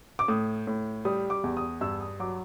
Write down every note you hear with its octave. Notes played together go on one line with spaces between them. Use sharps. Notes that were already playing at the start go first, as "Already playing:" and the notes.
D6
A2 D#6
A2
G3 D#6
D6
E2
D#6
G2 E6
D#6
F#3 D6